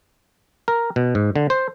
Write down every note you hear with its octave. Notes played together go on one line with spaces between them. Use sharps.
A#4
B2
G#2
D3
C5